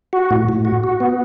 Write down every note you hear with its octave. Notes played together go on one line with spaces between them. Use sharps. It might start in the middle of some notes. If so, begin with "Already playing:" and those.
F#4
A2
A2
F#4
F#4
B3